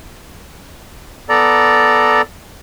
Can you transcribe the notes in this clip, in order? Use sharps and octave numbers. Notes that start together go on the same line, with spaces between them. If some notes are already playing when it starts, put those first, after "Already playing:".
B3 A4 D5 A#5